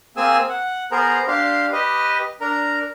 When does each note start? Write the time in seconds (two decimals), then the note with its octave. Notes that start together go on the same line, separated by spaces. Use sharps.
0.17 A#3 C4 G#4 G#5 E6
0.49 F#5
0.92 B3 G#4 A#4 C5 A#5
1.28 D4 G4 F5 C6
1.72 G4 B4 D#5
2.41 D4 A#4 A#5